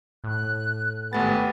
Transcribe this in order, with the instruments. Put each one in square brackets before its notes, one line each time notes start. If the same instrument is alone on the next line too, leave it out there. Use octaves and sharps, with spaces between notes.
[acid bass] A2 [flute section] F#6
[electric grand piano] G#1 A3 A6 [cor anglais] B3 [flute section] G4 G#5